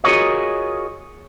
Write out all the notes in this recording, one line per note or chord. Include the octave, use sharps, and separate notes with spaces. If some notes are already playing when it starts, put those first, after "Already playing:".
F4 F#4 G#4 A#4 C#5 D#5